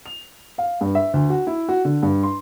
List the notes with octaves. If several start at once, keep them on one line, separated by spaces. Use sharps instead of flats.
F7
F5
G2
E5
D2
F#4
E4
F#4
D3
G2
C6